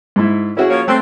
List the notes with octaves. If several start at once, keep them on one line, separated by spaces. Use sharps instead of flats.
G#2 E4
C#4 E4 F#4 G#4
F3 A#3 C#5
A3 C4 C6 F#6